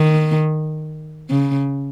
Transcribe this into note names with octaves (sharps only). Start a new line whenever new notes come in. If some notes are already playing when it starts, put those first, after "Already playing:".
Already playing: D#3
C#3